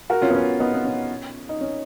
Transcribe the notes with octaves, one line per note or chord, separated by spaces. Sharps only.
F#4 A#4
C#4 F4
B3
C#4
B3 D#4
B3
C#4
D#4
C#4